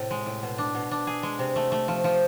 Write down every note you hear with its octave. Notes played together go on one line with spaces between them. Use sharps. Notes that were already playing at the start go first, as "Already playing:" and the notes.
Already playing: A2 C3
G#3
A2
B2
D4
B2
D4
G#4
G#3
C3
A3
A3
F3
F3